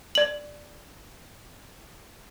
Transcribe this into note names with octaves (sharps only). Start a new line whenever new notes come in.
D5 F#7